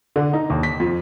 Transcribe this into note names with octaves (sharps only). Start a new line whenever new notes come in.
D3
D#4
D#2
B6
F2